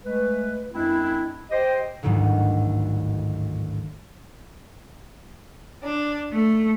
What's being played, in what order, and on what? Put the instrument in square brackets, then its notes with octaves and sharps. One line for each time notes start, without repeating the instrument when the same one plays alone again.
[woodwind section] G#3 A3 B4
F#2 G#3 C4 D4 E4
G4 C5 D#5 G5
[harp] A1 D2 G#2 D#3 F#3 G3
[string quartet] D4
A3